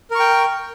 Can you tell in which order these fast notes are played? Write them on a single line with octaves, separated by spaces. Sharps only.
A#4 C#6 G5